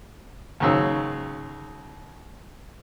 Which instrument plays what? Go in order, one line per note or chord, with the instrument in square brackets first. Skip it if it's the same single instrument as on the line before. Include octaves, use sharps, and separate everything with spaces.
[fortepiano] D#2 G#2 C#3 F#3 E6